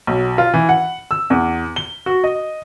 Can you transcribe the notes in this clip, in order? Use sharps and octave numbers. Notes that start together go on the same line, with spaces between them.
B1
F4
E3
F#5
E6
E2
G7
F#4
D#5